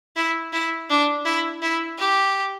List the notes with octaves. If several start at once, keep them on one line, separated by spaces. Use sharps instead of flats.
E4
E4
D4
E4
E4
G4